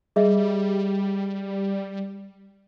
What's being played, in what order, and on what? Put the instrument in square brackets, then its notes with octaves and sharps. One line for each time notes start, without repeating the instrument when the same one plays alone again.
[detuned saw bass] G3 [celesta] G#4 D#5 E5